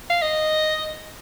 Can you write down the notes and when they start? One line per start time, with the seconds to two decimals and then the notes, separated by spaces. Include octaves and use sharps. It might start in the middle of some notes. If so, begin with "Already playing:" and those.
0.10 F5
0.22 D#5